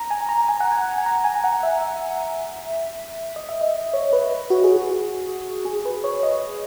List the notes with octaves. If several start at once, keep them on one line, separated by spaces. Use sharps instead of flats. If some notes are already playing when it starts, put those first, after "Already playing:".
Already playing: A#5
G#5
A#5
G#5
F#5
G#5
G#5
A#5
G#5
F#5
E5
D#5
E5
D#5
C#5
B4
F#4
G#4
F#4
G#4
B4
C#5
D#5